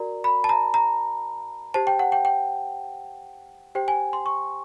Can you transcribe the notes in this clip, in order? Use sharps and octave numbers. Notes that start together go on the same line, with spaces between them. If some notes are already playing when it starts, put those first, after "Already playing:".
Already playing: F#4 A#4 D5 A#5
B5
A5
A#5
A#5
G4 C5 A5
G5
F#5
G5
G5
G4 C5 G5
G#5
C6
C#6